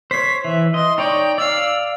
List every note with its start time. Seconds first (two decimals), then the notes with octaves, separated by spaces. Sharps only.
0.11 C5 C#5 B6
0.45 E3 E5
0.74 D#5 C6
0.98 D#4 C#5 D5 G5
1.38 D5 F5 E6